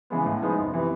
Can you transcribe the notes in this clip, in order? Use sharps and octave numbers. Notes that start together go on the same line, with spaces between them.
C#3 E3 G#3 B3
A2
F3 G#3 B3 D#4
F#1
C3 E3